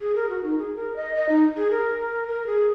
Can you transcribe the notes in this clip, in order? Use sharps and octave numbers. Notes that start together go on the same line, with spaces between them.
G#4
A#4
F#4
D#4
G#4
A#4
D#5
D#5
D#4
G#4
A#4
A#4
G#4